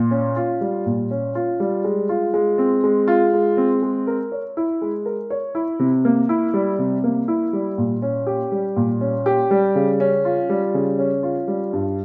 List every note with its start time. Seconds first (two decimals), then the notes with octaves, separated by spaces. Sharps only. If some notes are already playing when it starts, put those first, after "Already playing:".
Already playing: A#2
0.11 C#4
0.36 F4
0.61 G3
0.86 A#2
1.11 C#4
1.35 F4
1.60 G3
1.84 G#3
2.09 F4
2.34 G#3
2.58 C4
2.84 G#3
3.08 F4
3.33 G#3
3.57 C4
3.82 G#3
4.07 A#4
4.32 C#5
4.57 E4
4.82 G#3
5.06 A#4
5.30 C#5
5.55 E4
5.80 C3
6.05 A#3
6.29 E4
6.54 G3
6.79 C3
7.04 A#3
7.28 E4
7.53 G3
7.78 A#2
8.02 C#4
8.27 G4
8.52 G3
8.76 A#2
9.01 C#4
9.26 G4
9.51 G3
9.75 C#3
10.00 C#4
10.25 F4
10.49 G3
10.74 C#3
10.99 C#4
11.23 F4
11.48 G3
11.73 G2